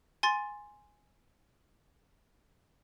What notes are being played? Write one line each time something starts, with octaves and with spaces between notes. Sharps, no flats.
G#5 C6 A6